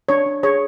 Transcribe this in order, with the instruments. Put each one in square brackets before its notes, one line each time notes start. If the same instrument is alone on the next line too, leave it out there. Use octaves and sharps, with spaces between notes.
[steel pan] D4 C#5
D4
G#4 C#5